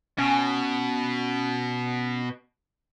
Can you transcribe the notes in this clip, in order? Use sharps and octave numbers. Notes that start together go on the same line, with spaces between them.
B2 C#4